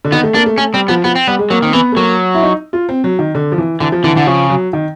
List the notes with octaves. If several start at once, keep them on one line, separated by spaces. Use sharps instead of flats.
D3
D#3 B3
A3
A#3 D4
A3
A3 C#4
G3 C4
F3 B3
F3 B3
C4
G3 B3
G#3
F#3 A#3
D#3 C4
E3 B3
A3
F#3 A#3
E4
D#4
F4
C4
F#3
D#3
D3
F3
E3
D3 E3
F3
D3 E3
D3 E3
C#3 F3
F#3
D#3